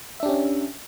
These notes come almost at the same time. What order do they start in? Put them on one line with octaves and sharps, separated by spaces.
E5 D4 G4 C#4